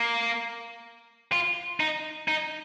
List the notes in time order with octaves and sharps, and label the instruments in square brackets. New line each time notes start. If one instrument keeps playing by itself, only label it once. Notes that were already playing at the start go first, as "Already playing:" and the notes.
Already playing: [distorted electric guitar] A#3
F4
D#4
D#4